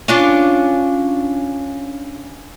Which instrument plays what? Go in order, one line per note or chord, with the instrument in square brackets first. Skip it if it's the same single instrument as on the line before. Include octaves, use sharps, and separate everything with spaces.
[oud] C#4 D4 F4